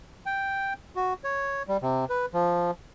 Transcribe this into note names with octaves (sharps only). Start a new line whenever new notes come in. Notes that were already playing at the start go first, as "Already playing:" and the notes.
G5
F#4
C#5
G3
C3
B4
F3